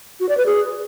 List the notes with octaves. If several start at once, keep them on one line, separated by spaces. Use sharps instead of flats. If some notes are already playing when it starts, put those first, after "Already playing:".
F#4
D5
B4
G#4